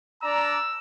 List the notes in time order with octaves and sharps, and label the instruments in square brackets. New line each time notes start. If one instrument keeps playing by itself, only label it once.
[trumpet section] D4 D5 A#5 [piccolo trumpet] E6